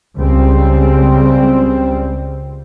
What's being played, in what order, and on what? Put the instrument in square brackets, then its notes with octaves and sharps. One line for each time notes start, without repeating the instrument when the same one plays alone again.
[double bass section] C#2 C#3 G3 C4